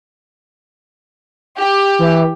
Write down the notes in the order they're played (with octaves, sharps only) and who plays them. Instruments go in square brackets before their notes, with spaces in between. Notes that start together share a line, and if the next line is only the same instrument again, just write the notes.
[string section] G4
[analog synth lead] E3